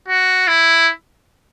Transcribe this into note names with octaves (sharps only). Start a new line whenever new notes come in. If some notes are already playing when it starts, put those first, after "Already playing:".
F#4
E4